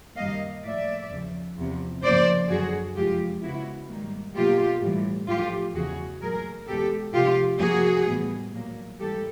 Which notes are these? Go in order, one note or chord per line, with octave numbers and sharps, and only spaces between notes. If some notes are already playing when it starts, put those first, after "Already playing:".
F#2 D#3 G3 A#3 D#5 F5
A2 F3 A#3 D5 E5
E2 C#3 F3
E2 C3 F3
C#3 F3 A#3 C5 D5
F#2 D3 F#3 F#4 G#4
F2 C3 F3 G#3 F4 G4
C#3 F3 G#3 B3 E4 F#4
G#2 D#3 G3 A#3
B2 F#3 A#3 F4 G4
A2 E3 G3
A2 F3 A3 F4 G4
E2 C#3 E3 F#4 G#4
A#2 F#3 A3 G#4 A#4
E2 B2 G#3 B3 G4 A4
C3 F3 A3 F4 G4
C3 F3 A#3 F#4 G#4
A2 E3 G3 B3
A#2 F#3 A#3
G#2 E3 G3 A#3 G4 A4